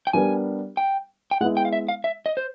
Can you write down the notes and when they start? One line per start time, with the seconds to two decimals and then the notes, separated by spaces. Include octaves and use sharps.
0.07 G5
0.13 G3 B3 D4 G4 A#4 G#5
0.77 G5
1.31 G5
1.41 G#3 B3 E4 F#5
1.57 G5
1.65 F5
1.73 E5
1.89 F5
2.04 E5
2.26 D#5
2.37 C5